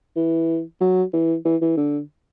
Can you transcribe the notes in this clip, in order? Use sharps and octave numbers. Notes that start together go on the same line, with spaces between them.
E3
F#3
E3
E3
E3
D3